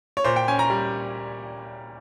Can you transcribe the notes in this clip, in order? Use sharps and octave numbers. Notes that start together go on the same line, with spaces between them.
C#5
A#2 C5
G5
C#4 G#5
A#5
G3